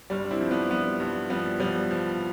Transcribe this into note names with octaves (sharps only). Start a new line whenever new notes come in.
G1 G3
D4
C4 E4
F3
B3 D4
F3 G3 B3
G2
F3 G3 B3
F3 G3 B3
F3